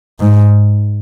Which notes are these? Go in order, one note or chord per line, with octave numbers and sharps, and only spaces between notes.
G#2